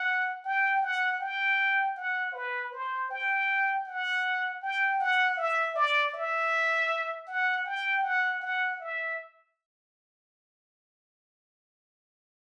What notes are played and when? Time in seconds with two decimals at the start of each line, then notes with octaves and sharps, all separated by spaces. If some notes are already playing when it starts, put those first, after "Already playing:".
Already playing: F#5
0.45 G5
0.82 F#5
1.21 G5
1.97 F#5
2.34 B4
2.72 C5
3.10 G5
3.86 F#5
4.62 G5
5.00 F#5
5.37 E5
5.75 D5
6.14 E5
7.27 F#5
7.66 G5
8.03 F#5
8.42 F#5
8.80 E5